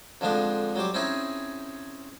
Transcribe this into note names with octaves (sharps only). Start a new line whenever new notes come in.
F2 D3 F3 G#3 D4 C5
F#3 G3 C5 D6
C4 C#4 D#4 E4 G#4